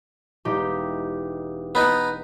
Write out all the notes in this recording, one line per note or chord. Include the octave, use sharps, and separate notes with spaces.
E1 D#4 G4
B3 D#4 B6